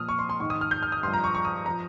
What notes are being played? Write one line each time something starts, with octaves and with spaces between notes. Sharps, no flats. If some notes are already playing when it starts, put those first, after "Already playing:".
Already playing: A#2 F3 D#6 F6
C#6
C6
C6
G#2 D#3 C#6
D#6
F6
G6
F6
D#6
G2 F3 C6
A#5
C#6
C#6
D#6
F3 A#5